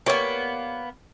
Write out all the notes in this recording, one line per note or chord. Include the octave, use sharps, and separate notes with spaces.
G3 A#3 B3 C#5